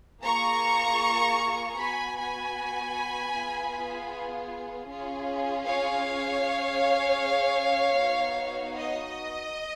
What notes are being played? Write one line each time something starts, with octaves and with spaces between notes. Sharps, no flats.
A#3 F4 G#4 A#5 C#6
B3 F#4 G#5 B5
G#5 B5
B3 F4 G#4
C#4 F4 G#4
C#5 F5
C#4 G#4
B3 D#4 F#4
D#5